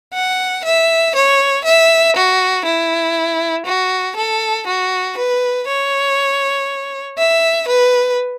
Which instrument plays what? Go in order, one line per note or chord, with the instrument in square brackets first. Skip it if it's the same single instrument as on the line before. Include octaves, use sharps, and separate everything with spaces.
[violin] F#5
E5
C#5
E5
F#4
E4
F#4
A4
F#4
B4
C#5
E5
B4